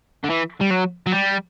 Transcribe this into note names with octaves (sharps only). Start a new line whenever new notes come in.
D3
E3
G3
F#3
F#3
G3